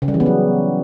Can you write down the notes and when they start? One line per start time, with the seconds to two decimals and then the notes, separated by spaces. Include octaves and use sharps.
0.02 C#3
0.08 G3
0.14 E3
0.20 B3
0.26 F#3